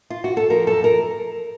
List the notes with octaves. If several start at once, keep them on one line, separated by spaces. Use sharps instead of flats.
F4
F#4
A4
F3 A#4
F#2 A4
A#4